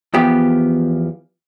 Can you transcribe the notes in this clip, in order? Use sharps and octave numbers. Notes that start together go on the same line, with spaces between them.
E2 F3 B3 G4